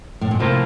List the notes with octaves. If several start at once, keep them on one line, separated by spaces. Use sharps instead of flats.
A2
A#2
A2 C3 F3 A#3 F4